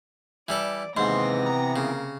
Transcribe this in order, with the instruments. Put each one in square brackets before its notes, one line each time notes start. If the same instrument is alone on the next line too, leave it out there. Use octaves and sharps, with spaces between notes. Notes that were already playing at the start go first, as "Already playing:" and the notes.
[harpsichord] E3 G3 A4 [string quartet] D5
[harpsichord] D#2 G#2 [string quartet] C3 A#6 [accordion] E3 B3 C4 [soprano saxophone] C6
[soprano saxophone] A#5
[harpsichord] C#3 [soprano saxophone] A#3